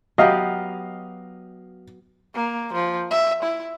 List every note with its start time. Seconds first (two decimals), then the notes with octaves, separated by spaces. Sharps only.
0.18 F#3 B3 G4 D#5 F5
2.35 A#3
2.73 F3
3.11 E5
3.43 E4